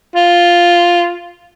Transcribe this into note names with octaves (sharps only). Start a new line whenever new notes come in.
F4